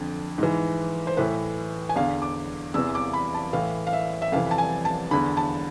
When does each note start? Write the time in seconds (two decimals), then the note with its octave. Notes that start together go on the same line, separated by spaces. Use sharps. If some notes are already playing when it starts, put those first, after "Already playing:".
Already playing: F2 D3
0.38 G#2 E3
1.07 C5
1.17 A2 E3 B4
1.89 G#5
1.96 E2 D3 F5
2.22 D6
2.74 E2 C3 E3 E6
2.95 D6
3.13 B5
3.34 A5
3.53 A2 E3 F5
3.87 F5
3.93 E5
4.22 E5
4.32 F2 C3 E3 F5
4.51 A5
4.58 G#5
4.85 A5
5.11 E2 D3 B5
5.37 A5